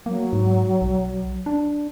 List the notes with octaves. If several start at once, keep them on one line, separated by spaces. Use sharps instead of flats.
F#3 A#3
G#2
B1
D4